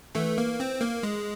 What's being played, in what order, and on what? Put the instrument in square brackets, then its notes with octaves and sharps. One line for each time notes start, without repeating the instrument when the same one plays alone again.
[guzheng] E3 [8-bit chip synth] A3
[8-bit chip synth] A#3
C4
A#3
G#3